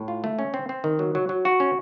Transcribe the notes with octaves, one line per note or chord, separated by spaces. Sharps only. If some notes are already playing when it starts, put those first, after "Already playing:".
Already playing: A2
F4
A3
C#4
C4
C4
D#3
F#3
F#3
F#3
F#4
C#4